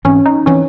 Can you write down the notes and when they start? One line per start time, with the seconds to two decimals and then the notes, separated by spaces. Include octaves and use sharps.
0.05 G#2 E3 C4 C#4
0.26 D#4
0.46 E3 C4 C#4